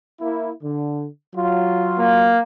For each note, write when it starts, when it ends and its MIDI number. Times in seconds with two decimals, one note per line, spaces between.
0.21 0.50 58
0.21 0.50 64
0.62 1.06 50
1.34 2.34 54
1.34 2.34 65
1.99 2.41 58